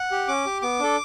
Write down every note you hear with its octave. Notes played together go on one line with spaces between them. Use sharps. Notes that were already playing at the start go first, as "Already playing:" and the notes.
Already playing: F#5
G4
C#4 D6
G4
B3 D6
D4 A4